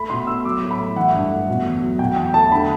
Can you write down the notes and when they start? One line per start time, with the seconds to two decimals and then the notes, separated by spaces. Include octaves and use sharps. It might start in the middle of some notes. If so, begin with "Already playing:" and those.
Already playing: A3 B5
0.10 B2 C6
0.27 B2 E6
0.45 F#3 D6
0.63 A2
0.71 B5
0.79 A3
0.96 E3 F#5
1.14 G2
1.31 A3
1.49 B2
1.65 E2
1.83 F#3
1.99 B2 G5
2.16 E2 G5
2.34 A3 A5
2.52 D3 B5